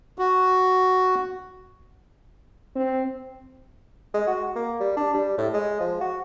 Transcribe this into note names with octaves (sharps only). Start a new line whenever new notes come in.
F#4
C4
G#3
F#4
A#3
G3
D4
G3
A2
G#3
F3
F#4